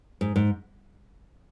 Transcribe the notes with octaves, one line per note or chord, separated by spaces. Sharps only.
G#2
G#2